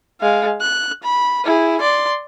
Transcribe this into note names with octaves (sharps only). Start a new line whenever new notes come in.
G#3 F5
F#6
B5
E4 G#4
D5 C6